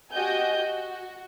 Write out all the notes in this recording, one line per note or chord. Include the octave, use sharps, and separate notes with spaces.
F#4 G4 D#5 G#5 G6
F#4